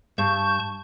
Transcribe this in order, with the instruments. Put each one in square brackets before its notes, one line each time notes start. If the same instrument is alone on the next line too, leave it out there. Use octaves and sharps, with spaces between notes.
[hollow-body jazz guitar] G2 [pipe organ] A5 C#6 G6